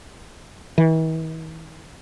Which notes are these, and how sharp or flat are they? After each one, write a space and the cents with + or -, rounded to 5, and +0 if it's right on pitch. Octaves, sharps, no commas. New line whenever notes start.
E3 -45